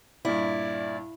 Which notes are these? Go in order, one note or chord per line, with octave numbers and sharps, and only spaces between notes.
G2 A#2 E4 D5